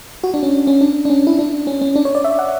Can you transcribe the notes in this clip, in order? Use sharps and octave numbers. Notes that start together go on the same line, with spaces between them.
F#4
D4
C#4
C#4
D4
D4
C#4
E4
D4
C#4
C#4
D4
C#5
D5
E5
F#5